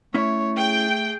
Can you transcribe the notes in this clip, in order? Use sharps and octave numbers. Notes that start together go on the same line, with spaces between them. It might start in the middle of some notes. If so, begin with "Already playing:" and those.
A3 C#4 E4 C#5 E5
G#4 G5